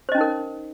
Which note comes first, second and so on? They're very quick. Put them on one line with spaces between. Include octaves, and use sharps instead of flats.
C5 D#5 C#4 D#4 A#4